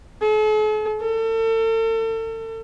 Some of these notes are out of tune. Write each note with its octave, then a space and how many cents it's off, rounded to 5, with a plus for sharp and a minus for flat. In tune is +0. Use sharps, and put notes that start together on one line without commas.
A4 -45
A4 +40